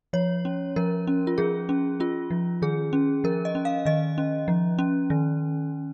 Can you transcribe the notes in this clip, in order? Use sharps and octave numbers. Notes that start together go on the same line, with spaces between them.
F3 C#5
C#4
F3 A#4
C#4
F4
F3 G#4
C#4
C#4 F4
F3
D#3 G#4
C#4
F3 A#4
D#5
C#4
F5
D#3 D#5
C#4
F3
C#4
D#3